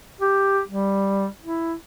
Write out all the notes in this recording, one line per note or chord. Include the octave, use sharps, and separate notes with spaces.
G4
G3
E4